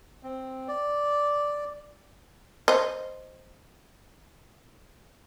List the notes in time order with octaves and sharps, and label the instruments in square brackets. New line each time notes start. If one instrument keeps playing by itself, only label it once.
[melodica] C4
D5
[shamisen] C5 D#5